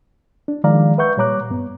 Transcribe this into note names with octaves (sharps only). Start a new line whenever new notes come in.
D4
D#3 F3 G#3 D5 F5 A#5
B4 E5 F#5 C#6 G6
A#2 G3 C#5 A#5 D6 F#6
G2 B3